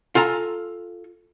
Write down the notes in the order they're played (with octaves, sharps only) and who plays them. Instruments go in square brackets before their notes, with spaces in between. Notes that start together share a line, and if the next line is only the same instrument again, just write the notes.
[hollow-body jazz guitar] F4 A4 G#5 A#5